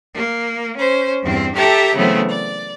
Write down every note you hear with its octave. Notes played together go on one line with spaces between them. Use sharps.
A#3
C#4 C5
E2 G2 C4
G4 A4 E5 G5 A5 A#5
C#3 E3 F#3 A3 B3 C4
D5